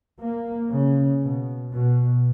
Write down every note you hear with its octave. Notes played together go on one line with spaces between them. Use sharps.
A#3
C#3
B2
B2